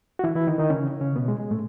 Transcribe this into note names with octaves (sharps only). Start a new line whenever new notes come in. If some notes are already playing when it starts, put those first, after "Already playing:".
F#4
E3 E4
E3 E4
D#3 D#4
D#3 D#4
C#3 C#4
C#3 C#4
B2 B3
G#3
G#3
A2 A3